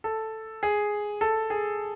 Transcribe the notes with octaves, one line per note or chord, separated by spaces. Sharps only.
A4
G#4
A4
G#4